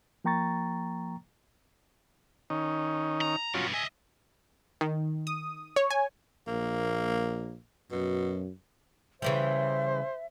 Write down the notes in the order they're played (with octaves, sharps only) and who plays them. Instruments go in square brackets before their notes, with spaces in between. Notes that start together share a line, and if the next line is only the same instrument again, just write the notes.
[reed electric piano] F3 A#3 G5 A#5 C#6 A6
[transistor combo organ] D#3 C#4 D#4
[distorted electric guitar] A#5
[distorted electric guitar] G2 B2 [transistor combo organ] F#3 C#4 F4
[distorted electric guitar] D#5 E5 [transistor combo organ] G#5
[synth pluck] D#3
D#6
C#5
G#5
[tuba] A#1 [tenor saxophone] A#3
[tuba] F#2 [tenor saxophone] B2
[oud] C#3 E3 G3 [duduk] C5 [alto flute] E5